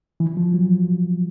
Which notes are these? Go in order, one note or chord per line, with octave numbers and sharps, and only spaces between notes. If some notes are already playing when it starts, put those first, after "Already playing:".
E3
F3
F#3